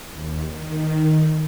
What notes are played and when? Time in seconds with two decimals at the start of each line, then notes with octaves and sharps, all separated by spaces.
0.13 D#2
0.45 D#3